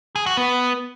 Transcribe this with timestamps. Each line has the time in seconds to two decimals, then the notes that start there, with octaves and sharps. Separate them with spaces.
0.16 G#4
0.26 F#4
0.37 B3